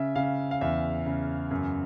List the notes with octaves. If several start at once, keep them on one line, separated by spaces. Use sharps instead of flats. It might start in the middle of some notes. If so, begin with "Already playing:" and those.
Already playing: C#3 E5
C#3 F5
F5
E2 E5
C#3
F#2